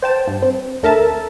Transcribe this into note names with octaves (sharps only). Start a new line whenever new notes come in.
C5 G5 A5
G2
C4
D2 A4 A#4 E5 A5